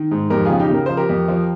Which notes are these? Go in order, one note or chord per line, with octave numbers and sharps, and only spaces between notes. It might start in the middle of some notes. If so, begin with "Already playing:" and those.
Already playing: D#3
G#2
F2 G4 A#4
C#3 F4 G#4
D#4 G4
C#3 A#4
F3 C5
G4 A#4
F2
F3